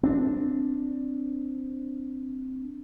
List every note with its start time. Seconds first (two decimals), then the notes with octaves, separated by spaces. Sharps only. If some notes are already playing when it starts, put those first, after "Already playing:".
0.03 C4 D4